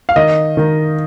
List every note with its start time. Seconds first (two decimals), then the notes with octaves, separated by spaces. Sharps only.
0.09 F5
0.16 D#3 D#5
0.57 D#3